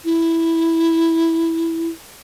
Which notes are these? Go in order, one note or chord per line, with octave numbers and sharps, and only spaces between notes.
E4